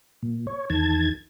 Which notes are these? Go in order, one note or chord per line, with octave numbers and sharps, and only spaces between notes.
A#2
C#5
E2 D#3 A5 G#6